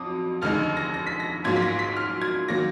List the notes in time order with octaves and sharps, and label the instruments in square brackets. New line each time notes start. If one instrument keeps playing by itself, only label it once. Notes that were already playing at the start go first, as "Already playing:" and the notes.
Already playing: [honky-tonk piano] F2 F#3 D6 D#6
F1 D#2 D3 G#3 D#4 F6
A#6
A#6
B6
A#6
A#1 G#2 F#3 A#3 F4 G#6
B6
A#6
B6
F6
G#6
D#3 F#3 A#3 A#6